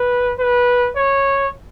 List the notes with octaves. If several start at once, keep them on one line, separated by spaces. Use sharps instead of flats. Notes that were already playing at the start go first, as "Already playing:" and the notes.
Already playing: B4
B4
C#5